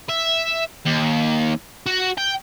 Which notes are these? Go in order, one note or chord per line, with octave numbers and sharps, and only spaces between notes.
E5
D#2
F#4
G5